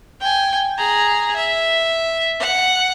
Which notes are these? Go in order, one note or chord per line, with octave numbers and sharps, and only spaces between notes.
G5 G#5
G#4 A#5
E5
F#5